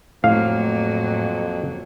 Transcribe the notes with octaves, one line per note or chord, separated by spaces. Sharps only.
F2 A2 F#3 A#3 F5